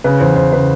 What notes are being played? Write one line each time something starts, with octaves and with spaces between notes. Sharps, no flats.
C#3 B4
E2 C5
E2 C5
C#3 B4